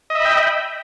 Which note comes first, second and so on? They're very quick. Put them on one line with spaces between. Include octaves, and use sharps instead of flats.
D#5 E5 B5 G5